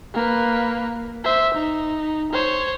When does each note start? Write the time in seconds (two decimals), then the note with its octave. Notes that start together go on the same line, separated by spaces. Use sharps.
0.14 A#3 B4
1.24 C5 E5
1.54 D#4
2.32 C5 C#5